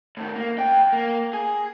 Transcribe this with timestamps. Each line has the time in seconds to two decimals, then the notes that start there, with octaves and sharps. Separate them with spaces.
0.17 A2 D#3
0.36 A#3
0.57 F2 G5
0.93 A#3
1.33 G#4